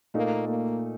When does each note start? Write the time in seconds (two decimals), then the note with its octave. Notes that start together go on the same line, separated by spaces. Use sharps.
0.14 A#2 A3 A#3 D#4
0.49 A#3